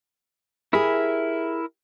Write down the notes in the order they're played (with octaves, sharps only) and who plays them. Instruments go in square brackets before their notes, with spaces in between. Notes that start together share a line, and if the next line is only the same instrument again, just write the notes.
[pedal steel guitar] E4 A#4 B5 [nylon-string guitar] G4 G#4